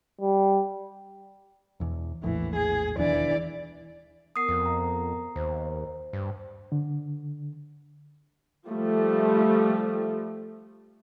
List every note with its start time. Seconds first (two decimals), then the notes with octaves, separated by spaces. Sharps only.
0.21 G3
1.80 E1 E2
2.23 A#1 E2 A2 E3
2.56 G#4
2.97 E1 D#2 E3 D4 D5
4.36 B3 A#4 F#5 D#6 C7
4.49 F2
4.66 A#5
5.36 D#2 C5
6.13 G2
6.72 D3
8.68 F3 G3 A3